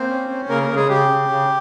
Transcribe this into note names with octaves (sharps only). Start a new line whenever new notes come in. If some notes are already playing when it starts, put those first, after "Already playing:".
Already playing: A#3 C4 C5
C#4
C#4
C#3 A#3 A#4
A#3 A#4
C#3
G#3 G#4
C#3 G4
C#3
C#3